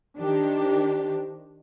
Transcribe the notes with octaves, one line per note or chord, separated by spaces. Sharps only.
D#3 D4 G4 C5